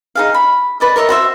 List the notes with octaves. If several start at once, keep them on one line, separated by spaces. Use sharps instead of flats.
D#4 G#4 F5
B5
B4 D5 D#5
A#4 C#5 D#5 E5
F#4 C5 E5